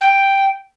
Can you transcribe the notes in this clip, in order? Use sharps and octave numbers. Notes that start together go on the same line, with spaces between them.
G5